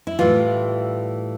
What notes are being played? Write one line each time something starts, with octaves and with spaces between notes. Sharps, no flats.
E4
A2 E3 G3 F4